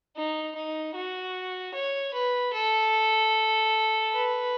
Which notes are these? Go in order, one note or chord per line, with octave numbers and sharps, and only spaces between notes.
D#4
D#4
F#4
C#5
B4
A4
B4